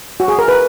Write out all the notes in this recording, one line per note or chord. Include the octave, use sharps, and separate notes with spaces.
F#4
G#4
A#4
B4